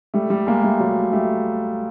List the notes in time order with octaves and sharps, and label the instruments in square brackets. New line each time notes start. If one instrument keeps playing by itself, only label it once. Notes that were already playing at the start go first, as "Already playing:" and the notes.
[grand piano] G3 A3
G3 A3
G#3 A#3
G3 A3
F#3 G#3
G3 A3